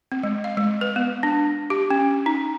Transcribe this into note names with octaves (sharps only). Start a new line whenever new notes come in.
C4
G#3
F5
G#3
B4
B3
D4
G4
C#4
D#4